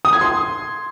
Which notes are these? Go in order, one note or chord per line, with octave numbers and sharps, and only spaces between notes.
D#6
G#6
C6